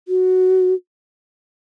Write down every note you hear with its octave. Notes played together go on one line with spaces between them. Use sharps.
F#4